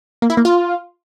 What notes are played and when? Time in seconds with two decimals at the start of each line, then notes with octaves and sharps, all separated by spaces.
0.22 A#3
0.30 E4
0.37 A#3
0.45 F4